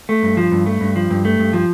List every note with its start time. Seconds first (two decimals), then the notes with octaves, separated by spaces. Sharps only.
0.09 A3
0.23 G2
0.37 F3
0.52 G2
0.66 A3
0.81 G2
0.96 F3
1.10 G2
1.25 A3
1.39 G2
1.53 F3